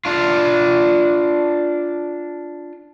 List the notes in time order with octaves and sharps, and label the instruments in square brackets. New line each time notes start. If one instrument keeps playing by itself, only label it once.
[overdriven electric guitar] D4 F4